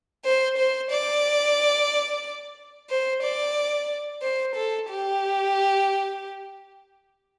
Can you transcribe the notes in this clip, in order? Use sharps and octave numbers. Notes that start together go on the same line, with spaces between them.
C5
C5
D5
C5
D5
C5
A4
G4